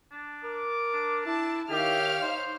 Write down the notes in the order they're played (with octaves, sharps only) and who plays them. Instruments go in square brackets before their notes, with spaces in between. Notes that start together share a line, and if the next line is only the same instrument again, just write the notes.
[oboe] D4
[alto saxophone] A#4 [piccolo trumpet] D6
[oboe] D4
[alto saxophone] E4 [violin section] A5
[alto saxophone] D#3 [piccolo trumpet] G4 [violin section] C#5 F5 F6 [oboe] E5
[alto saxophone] D#4 [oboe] C5